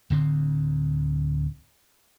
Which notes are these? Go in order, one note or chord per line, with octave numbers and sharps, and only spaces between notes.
D1 D2 D3 C4